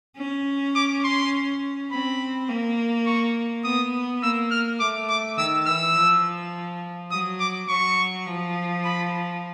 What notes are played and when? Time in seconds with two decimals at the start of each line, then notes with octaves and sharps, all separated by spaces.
0.18 C#4
0.76 D6
1.04 C6
1.91 C4 B5
2.49 A#3
3.06 C#6
3.64 B3 D#6
4.22 A#3 E6
4.51 F6
4.80 A3 D6
5.09 D6
5.38 D#3 E6
5.67 E3 E6
5.96 F3
7.11 F#3 D#6
7.40 D6
7.69 F#3 C#6
8.27 F3
8.85 B5